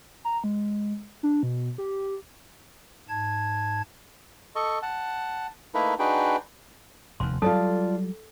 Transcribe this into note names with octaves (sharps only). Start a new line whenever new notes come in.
A#5
G#3
D4
B2
G4
G#2 A5 G#6
A4 D#5 C#6
F#5 A5
A3 A#3 D#4 E4 A#4 B4
D4 D#4 F#4 G#4 B4 G5
F1 D#2 C6
F#3 G3 F4 A4 D5 A5